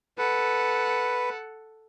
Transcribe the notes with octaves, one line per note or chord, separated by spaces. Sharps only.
A4 B4 F#5